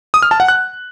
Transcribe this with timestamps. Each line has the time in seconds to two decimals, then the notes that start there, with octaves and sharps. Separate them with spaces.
0.14 D#6
0.23 F6
0.31 A5
0.40 F#5
0.48 F#6